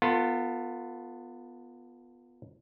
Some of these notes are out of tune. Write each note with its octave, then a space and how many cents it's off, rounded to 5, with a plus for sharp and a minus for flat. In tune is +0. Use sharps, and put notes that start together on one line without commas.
B3 +0 F4 +10 A4 +40